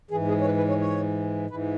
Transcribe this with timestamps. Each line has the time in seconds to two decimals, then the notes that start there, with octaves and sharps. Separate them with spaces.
0.11 E3 G#4
0.14 G#2
0.28 G#4
0.41 C#5
0.45 B4
0.57 B4
0.69 C#5
0.80 C#5
1.50 G#2 E3 B4